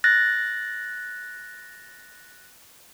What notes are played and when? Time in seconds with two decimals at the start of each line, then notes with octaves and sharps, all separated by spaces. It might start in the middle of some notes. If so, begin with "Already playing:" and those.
0.04 F#6 A6 A#6